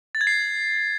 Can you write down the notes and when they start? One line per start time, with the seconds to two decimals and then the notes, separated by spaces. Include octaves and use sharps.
0.15 A6
0.21 G#6
0.27 C7